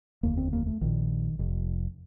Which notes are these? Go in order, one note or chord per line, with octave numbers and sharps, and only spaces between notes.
F1 D#2 D3 A#3
C4
A#3
A3
A#1 A#2 D#3
F1 F2 C3